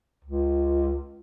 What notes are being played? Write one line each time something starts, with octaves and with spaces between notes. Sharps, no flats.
C#2